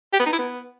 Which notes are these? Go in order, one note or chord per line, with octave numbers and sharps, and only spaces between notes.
G4
B3
D#4
E4
B3